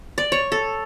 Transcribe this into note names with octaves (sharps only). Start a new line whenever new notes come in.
D5
C#5
A4